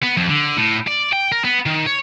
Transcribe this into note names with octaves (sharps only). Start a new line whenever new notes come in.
B3
F2
D3
A2
D5
G5
A#4
B3
D#3
C#5